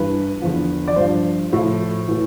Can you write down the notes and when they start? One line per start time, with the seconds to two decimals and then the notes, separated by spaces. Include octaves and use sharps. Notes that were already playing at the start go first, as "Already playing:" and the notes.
Already playing: G2 E3 B4
0.42 E2 D3 F3
0.88 D5
0.96 G2 F3 C5
1.53 A2 F3
2.08 A2 E3